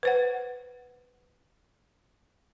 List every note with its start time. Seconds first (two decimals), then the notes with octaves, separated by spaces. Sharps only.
0.03 B4 C5 F#5